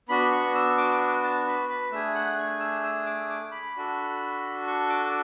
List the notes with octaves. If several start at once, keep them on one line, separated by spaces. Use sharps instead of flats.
B3 D4 F#4 B5
C#6
E6
D6
A5
B4
B4
A3 D4 G#4 E5
F#5
G#5
E6
E6
D6
D6
B5
D4 F#4 A4
C#6
D6